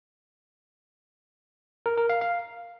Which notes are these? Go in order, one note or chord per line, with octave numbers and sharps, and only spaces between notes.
A#4
A#4
F5
F5